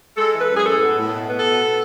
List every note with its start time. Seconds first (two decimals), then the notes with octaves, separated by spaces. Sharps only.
0.17 G#3 A4
0.34 E3
0.41 B4
0.49 F#2
0.56 G#4
0.65 A2 A4
0.81 B3
0.97 A2
1.14 B2
1.29 B3
1.37 A4
1.46 B2